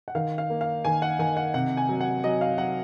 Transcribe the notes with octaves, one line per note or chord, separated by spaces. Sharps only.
F#5
D#3 F5
F5
A#3
F5
D#3 G#5
F#5
D#3 G#5
F#5
C3 F#5
G#5
F#3
F#5
F#3 D#5
F5
F#3 F#5